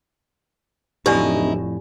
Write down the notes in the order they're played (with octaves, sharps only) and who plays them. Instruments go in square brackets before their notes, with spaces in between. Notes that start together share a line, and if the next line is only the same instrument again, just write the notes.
[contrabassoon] D1 [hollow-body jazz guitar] F2 A2 [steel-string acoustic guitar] D#4 E4 [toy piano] G4 D5 G#5